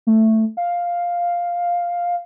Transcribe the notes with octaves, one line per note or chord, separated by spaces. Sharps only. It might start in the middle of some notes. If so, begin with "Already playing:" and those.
A3
F5